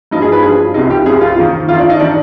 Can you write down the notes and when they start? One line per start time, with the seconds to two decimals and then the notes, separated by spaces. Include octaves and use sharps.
0.11 G2 F3 D#4
0.22 G#4
0.32 B4
0.43 G2 F3 G#4
0.74 C2 C3 F3 D#4
0.90 G4
1.06 C2 C3 F3 G#4
1.21 F4
1.37 F2 D#3
1.68 F2 D#3 F4
1.78 D4
1.90 D#4
2.00 D#3 D4